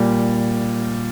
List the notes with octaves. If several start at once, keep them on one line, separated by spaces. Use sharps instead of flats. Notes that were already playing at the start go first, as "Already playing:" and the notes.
Already playing: A#2 G3